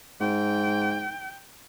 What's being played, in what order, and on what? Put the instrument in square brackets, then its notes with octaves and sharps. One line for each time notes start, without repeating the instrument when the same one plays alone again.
[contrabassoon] G#2 [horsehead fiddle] G5